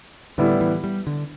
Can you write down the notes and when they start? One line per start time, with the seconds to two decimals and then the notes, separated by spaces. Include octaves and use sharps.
0.38 A2 D3 G3 B3 E4
0.61 E3
0.84 G3
1.07 D3